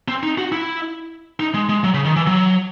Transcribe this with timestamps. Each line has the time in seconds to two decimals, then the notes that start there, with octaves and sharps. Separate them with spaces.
0.08 C4
0.23 D#4
0.38 F#4
0.52 E4
1.40 D#4
1.54 G#3
1.69 G#3
1.83 F#3
1.94 C#3
2.05 D#3
2.16 E3
2.27 F#3